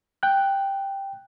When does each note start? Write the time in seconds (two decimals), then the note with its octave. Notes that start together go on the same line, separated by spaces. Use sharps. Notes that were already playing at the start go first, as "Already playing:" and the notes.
0.23 G5 F#6